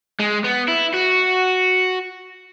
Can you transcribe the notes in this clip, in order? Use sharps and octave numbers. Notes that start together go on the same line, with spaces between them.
G#3
B3
E4
F#4